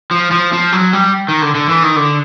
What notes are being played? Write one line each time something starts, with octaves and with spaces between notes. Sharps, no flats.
F3
F3
F3
F#3
G3
D#3
D3
D3
E3
D#3
D3